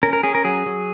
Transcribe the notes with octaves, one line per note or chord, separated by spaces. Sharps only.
C#4 A#4
A#4
C#4 G#4
A#4
F#3 G#4
F#3